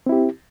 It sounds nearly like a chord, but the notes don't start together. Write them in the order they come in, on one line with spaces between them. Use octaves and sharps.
C4 E4 G4